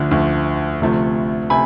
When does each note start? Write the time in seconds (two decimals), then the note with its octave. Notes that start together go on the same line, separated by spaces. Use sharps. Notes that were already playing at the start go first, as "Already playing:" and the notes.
Already playing: D2 D3 F3 A3
0.11 D2 D3 F3 A3
0.81 D2 C3 F3 A3
1.50 C3 G#5 B5